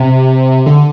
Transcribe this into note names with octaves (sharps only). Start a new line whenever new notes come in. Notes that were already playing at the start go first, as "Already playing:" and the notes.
Already playing: C3
D3